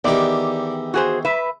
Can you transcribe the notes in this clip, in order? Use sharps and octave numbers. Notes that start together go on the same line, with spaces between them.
E2 D#3 G4 D5
F#4 G#4 C5
B4 E5